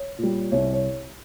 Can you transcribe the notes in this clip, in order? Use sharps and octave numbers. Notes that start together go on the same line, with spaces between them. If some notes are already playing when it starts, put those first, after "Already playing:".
Already playing: C#5
A#2 G3
C2 C#5
C#5